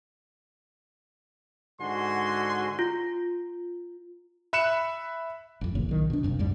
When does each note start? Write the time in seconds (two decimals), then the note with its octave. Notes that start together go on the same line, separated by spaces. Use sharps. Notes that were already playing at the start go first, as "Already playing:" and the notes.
1.80 G#2 D3 F#4 G#5 C6
2.79 F4
4.53 E5 B5 F#6 C#7 E7
5.61 A1 F2
5.75 F#1 E2 A#2 C#3
5.89 B1 D#3
6.10 B2 D4
6.23 G1 E2 G2 C3
6.39 A#1 F2 G#2 G3